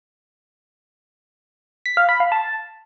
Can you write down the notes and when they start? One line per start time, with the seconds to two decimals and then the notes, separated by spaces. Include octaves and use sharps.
1.86 B6
1.97 F5
2.09 B5
2.20 F5
2.32 A5